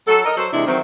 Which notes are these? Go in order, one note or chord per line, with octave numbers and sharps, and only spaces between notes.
F#3 A4
A#4 D#5
F#3 A4 C5
C3 E3 G#3 D4 E4
D#3 E3 F#3 C4